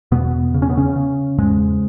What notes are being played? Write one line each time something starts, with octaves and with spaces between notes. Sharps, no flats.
E2 B2 B3
C#3
C#4
B3
C#3 C#4
C#3
E2 G#2 G#3